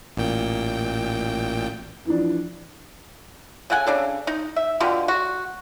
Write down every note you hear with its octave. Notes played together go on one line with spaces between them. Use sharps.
A1 A#2 G5
E3 F3 D4
C#3 A4 F#5 G#5
C#3 D4 A4
D#4
E5
B2 D3 G3 F4
F#4